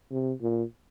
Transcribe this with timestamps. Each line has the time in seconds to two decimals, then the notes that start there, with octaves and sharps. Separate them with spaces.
0.11 C3
0.42 A#2